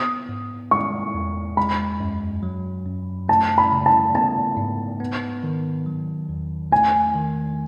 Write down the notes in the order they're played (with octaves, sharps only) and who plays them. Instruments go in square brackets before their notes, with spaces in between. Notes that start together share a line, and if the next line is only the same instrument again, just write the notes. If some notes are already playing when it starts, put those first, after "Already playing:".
Already playing: [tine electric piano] B3 [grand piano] D#6
[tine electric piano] G#2
[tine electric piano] G#3 [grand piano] C#6
[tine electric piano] E2
[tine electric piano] G#3 [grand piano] B5
[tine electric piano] F#2
F#3
F#2
[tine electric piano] A3 [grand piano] A5
[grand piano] B5
[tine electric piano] C#3
[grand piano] A5
[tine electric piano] B3 [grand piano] A5
[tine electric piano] G#2
B3
D#3
F#3
E2
[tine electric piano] A3 [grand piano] G#5
[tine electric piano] D#3